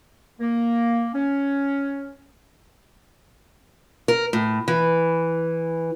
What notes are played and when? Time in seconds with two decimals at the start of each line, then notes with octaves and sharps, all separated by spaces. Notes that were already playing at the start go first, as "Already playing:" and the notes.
0.40 A#3
1.14 C#4
4.08 A#4
4.33 A2
4.68 E3